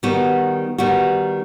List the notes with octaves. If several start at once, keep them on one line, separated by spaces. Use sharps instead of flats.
D#3 G3 B3 F#4
D#3 G3 B3 F#4